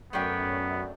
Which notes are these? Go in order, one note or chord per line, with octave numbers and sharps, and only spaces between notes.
F#2 A3 B3 D4 G5